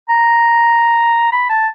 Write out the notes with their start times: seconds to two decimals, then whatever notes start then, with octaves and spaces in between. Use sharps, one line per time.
0.09 A#5
1.32 B5
1.49 A5